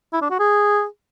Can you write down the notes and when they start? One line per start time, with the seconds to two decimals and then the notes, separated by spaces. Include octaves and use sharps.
0.13 E4
0.22 D4
0.31 F#4
0.39 G#4